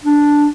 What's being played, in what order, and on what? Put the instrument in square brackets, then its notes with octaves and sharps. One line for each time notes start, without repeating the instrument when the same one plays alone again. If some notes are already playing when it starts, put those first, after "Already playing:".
[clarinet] D4